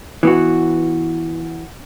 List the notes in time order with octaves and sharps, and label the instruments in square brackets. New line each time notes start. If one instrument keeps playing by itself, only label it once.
[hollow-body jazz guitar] E3 B3 F#4